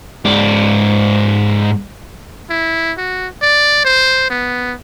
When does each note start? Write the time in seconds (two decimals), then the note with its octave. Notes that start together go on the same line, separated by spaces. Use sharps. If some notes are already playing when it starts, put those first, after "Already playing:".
0.25 G#2 D5
2.50 E4
2.98 F#4
3.42 D5
3.85 C5
4.30 B3